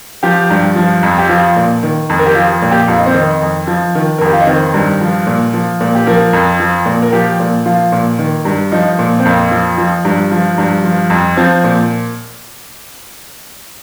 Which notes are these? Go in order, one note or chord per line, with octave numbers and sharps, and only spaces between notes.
F3 G4
G2
F3
F2
G4
F3 F4
A#2
D#3
F2
A#4
G4
F3 F4
A#2
G4
F2 F4
D#4
C4
D#3 D#4
F2
F3
D#3
A#4
F2 G4
F4
D#4
D#3 C4
G2
F3
A#2
F3
A#2
G4
F3 A#4
F2
F3
A#2
A#4
F3 G4
A#2
F3 F4
A#2
D#3
G2
F3 D#4
A#2
C4
F2 A#3
F3
F3
G2
F3
G2
F3
F2
F3 C4
A#2